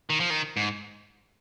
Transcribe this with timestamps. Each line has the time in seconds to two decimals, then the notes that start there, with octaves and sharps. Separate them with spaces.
0.10 D#3
0.20 F3
0.30 D#3
0.57 G#2